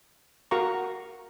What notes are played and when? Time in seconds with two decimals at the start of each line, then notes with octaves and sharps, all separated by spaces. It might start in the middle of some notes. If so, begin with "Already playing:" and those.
0.51 F#4 A#4 F5 A#5 C#6